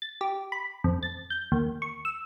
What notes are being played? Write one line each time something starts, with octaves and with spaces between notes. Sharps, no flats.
A6
G4
B5
F2
A6
G6
D#2
C#6
E6